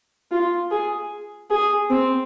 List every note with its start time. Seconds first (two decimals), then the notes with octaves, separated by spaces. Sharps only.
0.31 F4
0.71 G#4
1.50 G#4
1.90 C4